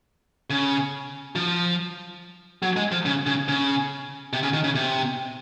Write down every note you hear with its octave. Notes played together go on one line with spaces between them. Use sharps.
C#3
F3
F#3
G#3
F3
C#3
C#3
C#3
C3
C#3
D#3
C#3
C3